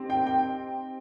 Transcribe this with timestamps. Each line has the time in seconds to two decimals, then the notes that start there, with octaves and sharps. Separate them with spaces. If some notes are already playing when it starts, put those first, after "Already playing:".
Already playing: C4 D#4 G4
0.10 G5
0.26 G5